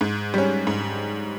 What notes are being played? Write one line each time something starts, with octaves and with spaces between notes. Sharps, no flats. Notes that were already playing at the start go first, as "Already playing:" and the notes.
G#2
G3 C#4
G#2